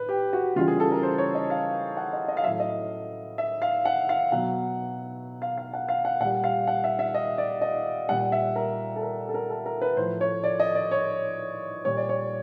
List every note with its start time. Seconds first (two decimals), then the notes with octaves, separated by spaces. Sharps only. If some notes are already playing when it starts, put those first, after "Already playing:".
Already playing: A2 B4
0.09 G4
0.33 F#4
0.56 C#3 E3 G3 F4
0.68 G#4
0.80 A4
0.91 A#4
1.03 C5
1.18 C#5
1.35 D#5
1.50 F5
1.97 F#5
2.13 D#5
2.28 D#5
2.37 F5
2.44 A2 F#3 E5
2.60 D#5
3.38 E5
3.62 F5
3.85 F#5
4.09 F5
4.32 B2 F#3 F#5
5.42 F5
5.57 F5
5.73 F#5
5.88 F5
6.05 F#5
6.20 A#2 F#5
6.24 G3
6.44 F5
6.67 F#5
6.84 E5
6.99 E5
7.14 D#5
7.38 D5
7.62 D#5
8.09 A#2 G3 F#5
8.32 E5
8.56 A#4
8.96 A4
9.03 A#4
9.29 A4
9.34 A#4
9.50 A4
9.66 A#4
9.81 B4
9.97 A2 F3 C5
10.21 C#5
10.44 D5
10.60 D#5
10.75 D5
10.91 C#5
11.85 A#2 G3 C#5
11.97 D5
12.09 C#5